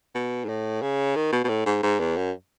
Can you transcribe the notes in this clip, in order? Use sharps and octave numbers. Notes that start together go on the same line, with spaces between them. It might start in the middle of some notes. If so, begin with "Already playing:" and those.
B2
G#2
A2
C#3
D#3
B2
B2
A2
G#2
G#2
E2
F#2